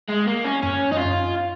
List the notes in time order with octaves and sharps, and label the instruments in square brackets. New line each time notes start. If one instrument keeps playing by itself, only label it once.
[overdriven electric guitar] G#3
A#3
C#4
[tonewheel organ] F#2 [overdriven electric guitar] C#4
[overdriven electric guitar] D#4
F4